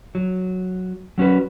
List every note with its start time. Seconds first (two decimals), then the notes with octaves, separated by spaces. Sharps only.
0.15 F#3
1.18 F#3 C#4 F#4 B4